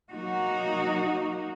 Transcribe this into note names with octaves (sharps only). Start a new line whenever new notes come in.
F#3 A#3 D#4 F#4